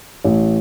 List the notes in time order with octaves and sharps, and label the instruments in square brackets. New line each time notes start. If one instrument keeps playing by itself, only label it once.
[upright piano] A1